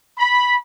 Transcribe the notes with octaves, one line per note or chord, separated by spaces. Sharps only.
B5